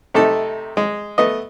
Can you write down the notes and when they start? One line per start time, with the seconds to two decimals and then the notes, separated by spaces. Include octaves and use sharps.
0.14 C3 A3 D#4 A4
0.77 G#3
1.18 A3 B3 D#5